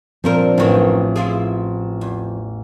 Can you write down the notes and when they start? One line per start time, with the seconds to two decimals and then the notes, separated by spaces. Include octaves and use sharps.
0.24 G2 A#2 F3 C4 A#4
0.58 A1 F#2 D#3
1.16 E4 F4 G#4
2.01 E2